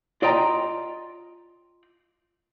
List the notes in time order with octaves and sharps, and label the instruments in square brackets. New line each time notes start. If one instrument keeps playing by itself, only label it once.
[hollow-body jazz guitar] F4 D5 D#5 G5 A#5